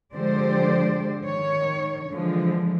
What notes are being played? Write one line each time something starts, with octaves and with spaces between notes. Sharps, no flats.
D3 F3 G#3 G4 C5 D5
D#3 C#5
D3 E3 F3 G#3